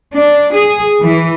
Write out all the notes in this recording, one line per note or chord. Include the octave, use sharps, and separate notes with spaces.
D4
G#4
E3